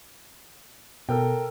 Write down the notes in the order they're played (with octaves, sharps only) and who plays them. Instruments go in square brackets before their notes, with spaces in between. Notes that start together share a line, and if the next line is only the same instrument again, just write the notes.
[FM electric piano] B2 [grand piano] A4 A#4 G5